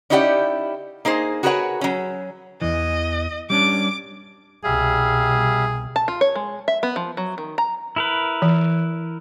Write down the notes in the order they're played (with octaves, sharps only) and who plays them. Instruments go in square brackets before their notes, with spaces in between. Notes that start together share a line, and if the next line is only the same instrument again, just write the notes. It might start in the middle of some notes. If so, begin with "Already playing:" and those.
[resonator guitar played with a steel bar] C#4 D#4 E4 G4 D5 F#5
A#3 D#4 G#4 C5
F#4 G#4 A#4 B4 C#5 F#5
F#3 C#4
[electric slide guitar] E2 E3 [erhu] D#5
[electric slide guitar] G3 C#4 D4 [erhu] D6
[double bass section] C2 B2 [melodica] G3 E5 F5 [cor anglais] G#4
[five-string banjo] A5
F4
C#5
G#3
E5
B3
F3
F#3
D#3
A#5
[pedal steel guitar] E4 A#4 B4
[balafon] E3